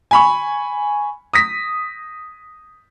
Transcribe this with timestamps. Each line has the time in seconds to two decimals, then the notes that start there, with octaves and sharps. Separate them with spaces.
0.11 G#5 B5 C#6
1.33 D#6 A#6 B6